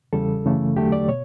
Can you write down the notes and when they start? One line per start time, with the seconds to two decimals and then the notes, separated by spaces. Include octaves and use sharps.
0.13 E2 C#3 G3 A4
0.45 F#2 C#3 E3 A3
0.76 E2 D3 F#3 A3 G4
0.92 D5
1.08 B2 C#5